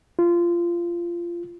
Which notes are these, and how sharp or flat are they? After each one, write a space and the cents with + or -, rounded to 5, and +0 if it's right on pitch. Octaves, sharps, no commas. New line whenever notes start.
F4 -20